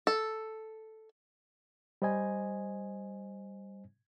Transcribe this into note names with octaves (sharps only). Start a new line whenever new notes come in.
A4
G3 C5 D#5 G#5